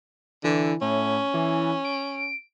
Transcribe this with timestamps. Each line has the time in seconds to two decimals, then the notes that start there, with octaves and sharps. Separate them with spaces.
0.44 D3 E3
0.82 A2 C#4
1.34 E3
1.85 D7